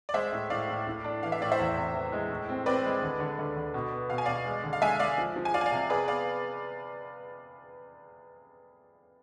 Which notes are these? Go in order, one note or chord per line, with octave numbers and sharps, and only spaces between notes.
D5
G#3 C5 E5
A2
A2 D5 F5
A2
A2
D4
E3 F5
E5
A2 D5
C5 E5
E2
C3
E3
G#3
A2
C4
C4 B4 D5
G#3
D3
D3
D2
D3
B2
B3
B2 F5
G#5
B2 D5 F5
G#3
D3
F5
G#3 E5 G#5
G#3 D5 F5
F3
F3
G#5
F3 D5 F5
G#5
D5 F5
C3
G#4 B4 D5
B3 D5 F5